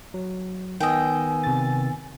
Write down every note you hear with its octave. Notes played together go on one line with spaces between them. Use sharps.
F#3
D#3 B3 D#5 G5 G#5 E6
C3 A6